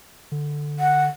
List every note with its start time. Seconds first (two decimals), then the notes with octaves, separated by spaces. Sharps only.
0.32 D3
0.79 F#5